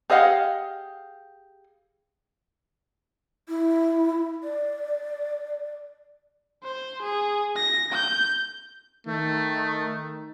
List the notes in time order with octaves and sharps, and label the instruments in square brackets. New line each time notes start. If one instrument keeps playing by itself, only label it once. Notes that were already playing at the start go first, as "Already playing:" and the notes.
[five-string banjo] G4 G#4 D#5 F5 F#5
[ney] E4
D5
[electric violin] C5
G#4
A#6
G6
[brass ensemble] D#3 [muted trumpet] A3